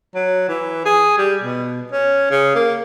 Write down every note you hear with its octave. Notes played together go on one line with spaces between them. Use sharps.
F#3
E3
G#4
G3
B2
C#4
C#3
A#3